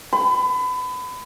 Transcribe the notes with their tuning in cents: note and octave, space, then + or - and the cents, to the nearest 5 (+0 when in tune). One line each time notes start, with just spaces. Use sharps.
B5 +30